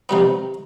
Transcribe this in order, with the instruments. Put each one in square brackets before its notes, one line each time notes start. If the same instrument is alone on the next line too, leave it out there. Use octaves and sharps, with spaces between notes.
[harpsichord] C3 D#3 G3 B3